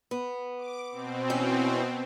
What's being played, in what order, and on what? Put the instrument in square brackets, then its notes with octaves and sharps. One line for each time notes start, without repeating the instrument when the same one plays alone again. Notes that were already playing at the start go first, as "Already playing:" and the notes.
[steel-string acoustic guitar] B3
[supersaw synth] D6
B2 C4
[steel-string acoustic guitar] E3 C#4